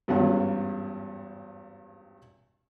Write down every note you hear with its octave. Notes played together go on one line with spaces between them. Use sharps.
G#1 E2 G2 C#4 F4 F#5